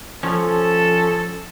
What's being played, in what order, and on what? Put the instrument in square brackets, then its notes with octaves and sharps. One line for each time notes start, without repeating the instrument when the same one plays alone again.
[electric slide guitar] F3 C#4 [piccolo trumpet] A4